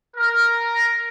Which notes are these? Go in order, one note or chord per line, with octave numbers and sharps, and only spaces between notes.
A#4